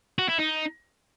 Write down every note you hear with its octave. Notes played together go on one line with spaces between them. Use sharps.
F#4
E4
D#4